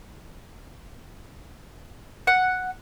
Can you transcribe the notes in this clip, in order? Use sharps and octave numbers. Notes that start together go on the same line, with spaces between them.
F#5